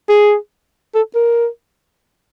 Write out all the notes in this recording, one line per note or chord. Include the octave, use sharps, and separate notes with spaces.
G#4
A4
A#4